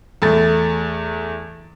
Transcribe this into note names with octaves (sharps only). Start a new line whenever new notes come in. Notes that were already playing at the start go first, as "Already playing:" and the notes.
E2 A3 A6